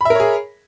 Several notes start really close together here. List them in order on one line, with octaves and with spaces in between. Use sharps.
B5 E5 A#4 C#5 G#4